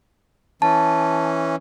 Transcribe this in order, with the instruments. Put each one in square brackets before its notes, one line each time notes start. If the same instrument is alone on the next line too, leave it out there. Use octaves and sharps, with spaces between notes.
[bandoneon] E3 C#4 [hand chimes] A5